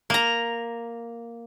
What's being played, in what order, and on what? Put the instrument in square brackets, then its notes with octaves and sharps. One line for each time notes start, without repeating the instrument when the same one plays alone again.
[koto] A#3 A#5